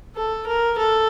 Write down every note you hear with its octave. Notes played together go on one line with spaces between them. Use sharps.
A4
A#4
A4